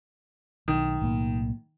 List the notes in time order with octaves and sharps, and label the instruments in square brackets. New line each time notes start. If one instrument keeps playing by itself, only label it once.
[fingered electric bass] B1 [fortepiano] D#3
[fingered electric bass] B1 A2 A#3